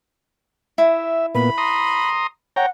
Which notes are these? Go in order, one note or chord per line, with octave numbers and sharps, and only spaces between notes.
E4 E5
A#2 B3 B5
A#5 C6 D#6
C#5 F#5 G5 A#5